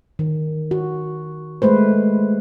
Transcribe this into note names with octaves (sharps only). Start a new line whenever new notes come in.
D#3
F#4
G#3 A3 B4 C5